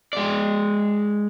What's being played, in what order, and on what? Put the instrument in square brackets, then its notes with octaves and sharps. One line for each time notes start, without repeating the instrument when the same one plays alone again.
[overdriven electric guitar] G#3 D5